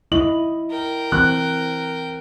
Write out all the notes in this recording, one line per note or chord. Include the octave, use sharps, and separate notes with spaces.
E4 D#5 F#7
A#4 G5
E3 C4 F#6